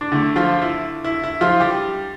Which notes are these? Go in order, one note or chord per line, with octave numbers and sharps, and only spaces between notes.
D4
D3 A3 E4
F3 F4
E4
E4
E4
F3 F4
G3 G4